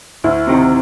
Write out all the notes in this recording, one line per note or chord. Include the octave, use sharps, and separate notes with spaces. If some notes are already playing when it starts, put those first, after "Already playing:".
D2 E4
C3 D#3